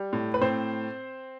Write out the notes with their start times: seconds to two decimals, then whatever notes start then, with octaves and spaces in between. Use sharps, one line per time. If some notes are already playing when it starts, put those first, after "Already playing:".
Already playing: G3
0.13 A2
0.34 B4
0.41 A2 C4 C5